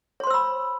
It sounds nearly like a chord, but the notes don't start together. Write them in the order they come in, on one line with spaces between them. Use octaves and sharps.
C#5 C6 C5 E6 B5